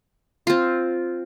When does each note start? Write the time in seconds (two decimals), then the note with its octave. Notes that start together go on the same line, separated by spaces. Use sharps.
0.47 C4 F4